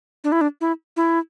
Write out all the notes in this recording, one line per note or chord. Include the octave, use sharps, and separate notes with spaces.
D4
E4
D4
E4
E4